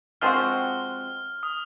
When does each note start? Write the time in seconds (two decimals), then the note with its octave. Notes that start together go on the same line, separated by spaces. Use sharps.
0.22 F3 G#3 C4 F#4 F6
1.43 D#6